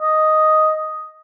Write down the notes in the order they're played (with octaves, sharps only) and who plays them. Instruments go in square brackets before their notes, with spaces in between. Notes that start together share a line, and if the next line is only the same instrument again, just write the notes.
[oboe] D#5